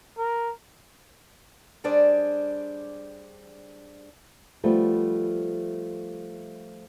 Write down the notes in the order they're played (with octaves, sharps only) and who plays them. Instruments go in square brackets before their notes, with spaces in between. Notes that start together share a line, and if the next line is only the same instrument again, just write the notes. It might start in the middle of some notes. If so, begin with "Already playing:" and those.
[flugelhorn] A#4
[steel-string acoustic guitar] G3 D4 G#4 C5 D5
[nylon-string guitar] F3 G3 A3 B3